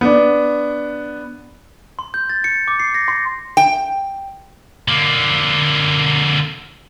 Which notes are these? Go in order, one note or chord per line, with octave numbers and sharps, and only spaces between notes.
B3 D4
C6
G6
A6
C#7
D6
C7
A#6
C6
G5
D3 A#3